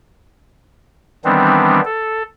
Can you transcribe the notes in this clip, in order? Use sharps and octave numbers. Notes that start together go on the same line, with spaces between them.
D#3 E3 G3 B3 C4 D4
A4